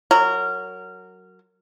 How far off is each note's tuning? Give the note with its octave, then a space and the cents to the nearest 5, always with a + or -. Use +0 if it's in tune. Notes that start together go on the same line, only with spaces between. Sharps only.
F#3 +0 A#4 -20